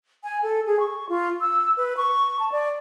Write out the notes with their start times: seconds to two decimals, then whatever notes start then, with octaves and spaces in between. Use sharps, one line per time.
0.24 G#5
0.43 A4
0.66 G#4
0.80 C#6
1.09 F4
1.41 E6
1.77 B4
1.97 C#6
2.39 A5
2.52 D5